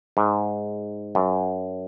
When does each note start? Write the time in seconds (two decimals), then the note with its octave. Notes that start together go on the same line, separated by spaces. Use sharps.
0.17 G#2
1.15 F#2